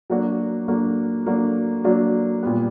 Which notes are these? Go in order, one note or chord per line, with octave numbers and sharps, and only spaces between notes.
F#3 A#3 D4 F#4
F#3 A#3 D4 F#4
F#3 A#3 D4 F#4
F#3 A#3 D4 F#4
A#2 G3 B3